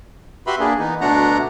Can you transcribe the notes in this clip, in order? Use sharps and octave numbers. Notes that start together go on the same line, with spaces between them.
F#4 G4 B4 E5 B5 C6
A#3 D4 G#4
E3 B3 D#4
D2 B2 A3 D4 F#5 A#5